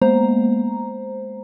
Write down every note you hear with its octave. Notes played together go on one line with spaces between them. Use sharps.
G#3 A#3 B3 C5 A#5